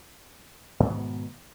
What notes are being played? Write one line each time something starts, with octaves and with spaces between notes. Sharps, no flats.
G#2 B2 D#3 B3